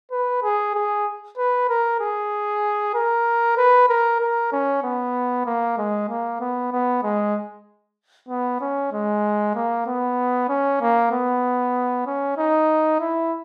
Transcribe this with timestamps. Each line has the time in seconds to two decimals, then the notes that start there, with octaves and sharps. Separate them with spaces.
0.12 B4
0.43 G#4
0.75 G#4
1.38 B4
1.69 A#4
2.00 G#4
2.95 A#4
3.58 B4
3.89 A#4
4.21 A#4
4.52 C#4
4.83 B3
5.46 A#3
5.78 G#3
6.09 A#3
6.41 B3
6.72 B3
7.03 G#3
8.29 B3
8.61 C#4
8.92 G#3
9.55 A#3
9.87 B3
10.49 C#4
10.81 A#3
11.12 B3
12.06 C#4
12.38 D#4
13.00 E4